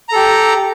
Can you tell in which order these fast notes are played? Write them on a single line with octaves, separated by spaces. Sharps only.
A#5 A4 G4